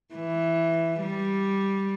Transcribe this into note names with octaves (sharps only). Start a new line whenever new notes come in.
E3
G3